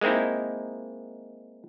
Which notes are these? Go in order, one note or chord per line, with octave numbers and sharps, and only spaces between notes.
G#3 A#3 C4 D#4 E4